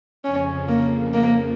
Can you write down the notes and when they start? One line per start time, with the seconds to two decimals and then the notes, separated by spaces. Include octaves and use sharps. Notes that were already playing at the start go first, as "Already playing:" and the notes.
0.24 F2 C#3 F3 C#4
0.69 A#3
1.14 A#3